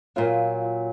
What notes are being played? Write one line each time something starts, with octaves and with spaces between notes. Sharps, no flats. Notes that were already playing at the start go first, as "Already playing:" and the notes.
A#2 F#3 F4